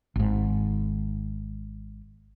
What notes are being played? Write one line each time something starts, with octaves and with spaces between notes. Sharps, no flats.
G#1 G#2